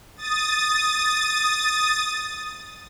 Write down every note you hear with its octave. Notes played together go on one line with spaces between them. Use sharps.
D#6 A6